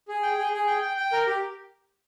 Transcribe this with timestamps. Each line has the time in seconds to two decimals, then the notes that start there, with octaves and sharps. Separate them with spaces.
0.08 G#4
0.23 G5
0.38 G#4
0.53 G#4
0.67 G5
0.82 G5
0.97 G5
1.12 A#4
1.27 G4